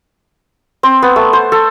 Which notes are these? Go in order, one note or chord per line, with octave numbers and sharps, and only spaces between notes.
C4
B3
A3
C5
A4